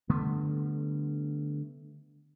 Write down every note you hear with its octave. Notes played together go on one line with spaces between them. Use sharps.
D3 G3 A3 B3